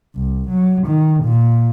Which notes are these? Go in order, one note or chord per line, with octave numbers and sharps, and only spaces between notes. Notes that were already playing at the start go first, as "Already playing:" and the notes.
C2
F#3
D#3
A#2